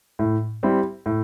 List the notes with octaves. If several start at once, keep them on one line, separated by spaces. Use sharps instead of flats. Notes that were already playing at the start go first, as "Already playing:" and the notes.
A2
G3 C4 E4
A2